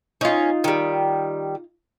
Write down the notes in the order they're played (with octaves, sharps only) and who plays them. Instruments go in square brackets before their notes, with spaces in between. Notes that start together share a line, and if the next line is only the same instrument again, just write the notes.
[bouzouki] C#4 [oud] D#4 F4
[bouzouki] D#3 G3